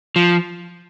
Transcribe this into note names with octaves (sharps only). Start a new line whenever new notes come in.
F3